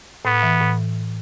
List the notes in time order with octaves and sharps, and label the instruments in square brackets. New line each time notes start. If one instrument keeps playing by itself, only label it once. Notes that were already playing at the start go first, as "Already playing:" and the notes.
[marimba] A2 [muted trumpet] B3
[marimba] E3
A2